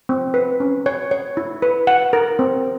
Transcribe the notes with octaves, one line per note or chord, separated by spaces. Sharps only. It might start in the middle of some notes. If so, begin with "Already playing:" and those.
C4
B4
C#4
C#5
C#5
E4
B4
F#5
A#4
C4